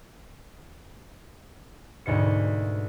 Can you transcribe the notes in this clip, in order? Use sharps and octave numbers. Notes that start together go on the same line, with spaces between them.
D2 G#2 B2 C#7